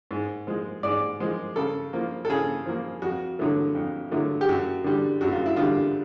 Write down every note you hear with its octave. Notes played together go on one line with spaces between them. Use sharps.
G#2
F3 G#3
G#2 D5
F3 G#3
C#3 A4
F3 A#3
A4
C#3 G#4
F3 A#3
F2 F#4
D3 F#3 A3
F2
D3 F#3 A3
G4
F#2 F#4
D3 G3
F#2 F#4
F4
E4
D3 G3 F4